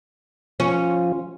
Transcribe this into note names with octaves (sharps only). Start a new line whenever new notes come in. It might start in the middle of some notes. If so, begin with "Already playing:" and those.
F3 C#4 F4